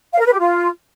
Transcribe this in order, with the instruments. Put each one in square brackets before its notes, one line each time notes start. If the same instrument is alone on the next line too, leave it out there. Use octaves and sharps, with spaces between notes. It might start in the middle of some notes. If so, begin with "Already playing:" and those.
[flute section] F5
A#4
B4
G4
F4